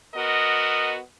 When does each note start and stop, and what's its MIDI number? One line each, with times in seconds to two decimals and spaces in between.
0.15 0.99 59
0.15 0.99 66
0.15 0.99 70
0.15 0.99 75